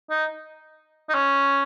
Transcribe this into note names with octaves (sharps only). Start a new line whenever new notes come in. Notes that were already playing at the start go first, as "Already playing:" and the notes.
D#4
D#4
C#4